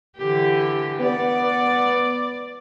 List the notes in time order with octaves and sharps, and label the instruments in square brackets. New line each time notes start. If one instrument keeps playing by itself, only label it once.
[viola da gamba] D3 E3 G4
[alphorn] B3 [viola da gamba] D5